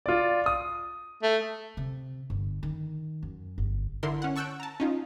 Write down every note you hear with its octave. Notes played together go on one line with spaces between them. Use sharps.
F4 D5
D#6
A3
C3
G1
D#3
F#2
G1
D3 E4 A#4 C6
C#4 F#5
A5 C#6 E6 F#6 G6 D7
A5 A#5
C#4 D#4 F4